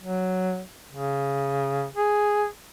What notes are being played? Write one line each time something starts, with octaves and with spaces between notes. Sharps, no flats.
F#3
C#3
G#4